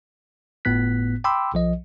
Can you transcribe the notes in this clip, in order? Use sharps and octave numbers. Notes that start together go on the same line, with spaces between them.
G1 A2 B3 F#6 B6
G5 B5 C6 D6 E6
B1 F3 D#5